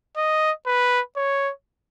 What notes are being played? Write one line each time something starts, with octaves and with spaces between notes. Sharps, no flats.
D#5
B4
C#5